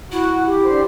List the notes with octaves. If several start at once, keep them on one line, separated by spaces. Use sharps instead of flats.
E4 F#4
G4
D3 C5